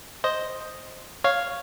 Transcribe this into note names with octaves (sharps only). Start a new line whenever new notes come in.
C5 D#5
C#5 F5